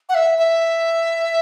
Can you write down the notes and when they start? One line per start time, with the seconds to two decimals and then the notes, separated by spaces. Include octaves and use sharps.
0.09 F#5
0.15 E5
0.38 E5